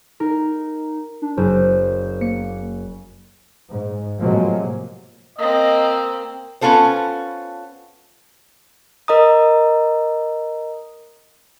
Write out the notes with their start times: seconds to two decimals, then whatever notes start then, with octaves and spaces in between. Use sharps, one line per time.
0.20 D#4 A#4
1.22 D4
1.37 F#1 C5
2.21 A#3 C#7
3.68 G#2
4.19 A2 C3 F3 F#3 G#3 A#3
5.38 A#3 C4 D#5
6.61 B3 C#4 F4 A4 C5
9.08 A#4 D#5 A#5 D#6